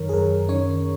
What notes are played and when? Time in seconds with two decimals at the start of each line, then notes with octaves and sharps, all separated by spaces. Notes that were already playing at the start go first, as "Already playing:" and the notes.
Already playing: F#2 D#3 A#4 C#5
0.09 G#4
0.13 F#2 A#4
0.49 D#3 C#4 C#5